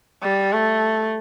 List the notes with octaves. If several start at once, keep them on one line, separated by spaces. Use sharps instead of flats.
G3
A3